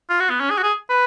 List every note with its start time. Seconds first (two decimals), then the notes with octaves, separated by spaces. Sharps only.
0.10 F4
0.20 F#4
0.30 B3
0.40 C#4
0.50 G#4
0.58 F#4
0.63 G#4
0.90 B4